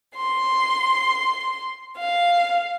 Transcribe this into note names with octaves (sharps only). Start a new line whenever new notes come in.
C6
F5